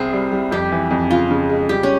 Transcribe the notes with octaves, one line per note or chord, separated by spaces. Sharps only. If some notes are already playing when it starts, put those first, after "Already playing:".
Already playing: C2 C4 G#4
G3
G3
F2 G4
E3
F2
C#3 F4
C#3
G#3
G3 G4
C#4